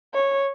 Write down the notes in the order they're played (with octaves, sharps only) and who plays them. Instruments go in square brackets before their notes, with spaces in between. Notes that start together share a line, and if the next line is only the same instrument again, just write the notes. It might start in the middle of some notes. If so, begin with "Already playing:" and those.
[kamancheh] C#5